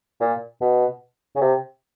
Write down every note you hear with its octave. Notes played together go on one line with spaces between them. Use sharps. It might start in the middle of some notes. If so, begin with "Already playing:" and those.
A#2
B2
C#3
C3